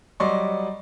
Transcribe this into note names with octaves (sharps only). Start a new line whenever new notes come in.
F#3 G3 D5 D#5 C6 C#6